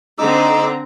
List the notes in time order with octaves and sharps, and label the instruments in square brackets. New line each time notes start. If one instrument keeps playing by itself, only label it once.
[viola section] D3 C4 A#5 [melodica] D#4 D6 E6